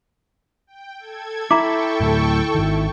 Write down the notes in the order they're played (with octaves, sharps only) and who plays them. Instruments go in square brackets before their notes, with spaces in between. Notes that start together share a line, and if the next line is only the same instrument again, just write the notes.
[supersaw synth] G5
A4 G#6
[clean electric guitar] E4 [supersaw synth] A4 G5 C#6 [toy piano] A#5 D6
[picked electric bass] D2 A2
G#1 D#3